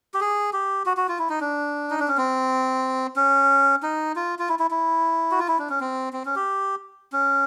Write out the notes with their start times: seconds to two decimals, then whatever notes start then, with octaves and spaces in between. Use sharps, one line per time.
0.14 G4
0.21 G#4
0.53 G4
0.86 F#4
0.97 F#4
1.09 F4
1.19 E4
1.29 D#4
1.41 D4
1.90 D#4
2.00 D4
2.08 C#4
2.18 C4
3.16 C#4
3.83 D#4
4.16 F4
4.39 F4
4.49 E4
4.59 E4
4.71 E4
5.31 F#4
5.39 F4
5.48 E4
5.59 D4
5.70 C#4
5.80 C4
6.13 C4
6.25 C#4
6.36 G4
7.12 C#4